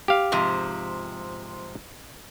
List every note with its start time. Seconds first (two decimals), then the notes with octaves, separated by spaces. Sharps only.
0.08 G4 F5
0.32 G#2 C3 F3